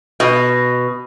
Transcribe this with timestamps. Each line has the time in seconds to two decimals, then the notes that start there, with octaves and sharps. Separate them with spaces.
0.20 B2